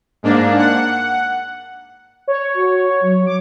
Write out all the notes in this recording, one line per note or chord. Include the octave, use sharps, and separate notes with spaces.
G#2 A#3 D4
F#5
C#5
F#4
F#3
D6